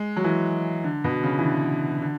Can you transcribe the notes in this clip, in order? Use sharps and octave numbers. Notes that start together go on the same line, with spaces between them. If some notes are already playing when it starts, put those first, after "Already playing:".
Already playing: G#3
F#3
E3
D3
B2
C#3
E3
D3
D3